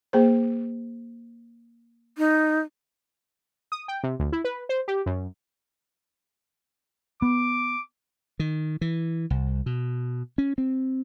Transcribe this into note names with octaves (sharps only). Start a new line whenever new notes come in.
A#3 G#4 C5
D#4
D#6
G5
C3
D2
E4
B4
C5
G4
F#2
B3 D6
D#3
E3
C2
B2
C#4
C4